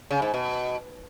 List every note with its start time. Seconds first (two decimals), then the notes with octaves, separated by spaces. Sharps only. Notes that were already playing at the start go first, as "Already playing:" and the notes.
0.11 C#3
0.22 G#2
0.34 B2